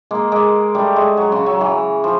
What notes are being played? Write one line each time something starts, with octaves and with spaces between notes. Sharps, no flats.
G#3 A#3
G#3 A#3
G3 A3
G#3
F#3
C#3
F#3
E3
F3